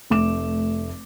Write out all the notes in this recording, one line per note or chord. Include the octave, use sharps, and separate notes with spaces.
F1 A3 D6 E7